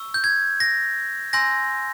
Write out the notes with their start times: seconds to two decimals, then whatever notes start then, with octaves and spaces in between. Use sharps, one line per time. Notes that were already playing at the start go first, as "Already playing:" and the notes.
Already playing: C#6 E6
0.14 G6
0.24 G#6
0.60 A#6
1.33 G#5 C6 E6 G6 A#6